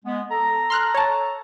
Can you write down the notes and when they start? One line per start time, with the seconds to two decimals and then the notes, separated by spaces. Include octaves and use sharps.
0.05 G#3 B3
0.31 A4 A#5
0.70 C6 F6 F#6
0.94 C#5 A5